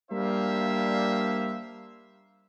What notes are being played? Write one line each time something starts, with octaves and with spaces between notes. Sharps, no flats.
G3 A#3 D4 C5 E5 F5